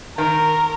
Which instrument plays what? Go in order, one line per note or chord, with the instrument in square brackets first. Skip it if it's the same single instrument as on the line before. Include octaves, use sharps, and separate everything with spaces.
[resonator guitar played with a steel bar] D#3 [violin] A#4